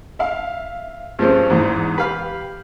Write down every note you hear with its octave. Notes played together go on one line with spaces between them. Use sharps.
E5 F5
G2 F3 G3 G#3 C4 C#4
E2 G#2 E3
G4 B4 F5